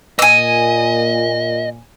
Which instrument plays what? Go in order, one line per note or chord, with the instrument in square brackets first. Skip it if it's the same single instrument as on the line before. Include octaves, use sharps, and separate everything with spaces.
[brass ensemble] A#2 [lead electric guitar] D#5 [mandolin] G#5 E6